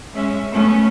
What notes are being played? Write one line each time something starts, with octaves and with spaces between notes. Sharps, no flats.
G#3 C#4 E5
A3 B3 C#4